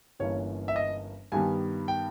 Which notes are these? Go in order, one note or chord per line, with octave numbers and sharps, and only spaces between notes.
G1 G2 E3 A#3 C#4 C#5
E5
D#5
G2 D#3 G3 B3 G#5
G5